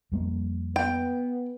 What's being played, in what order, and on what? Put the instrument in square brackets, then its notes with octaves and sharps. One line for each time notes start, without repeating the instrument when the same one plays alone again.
[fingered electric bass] F2 G3 A#3
[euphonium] B3 [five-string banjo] G5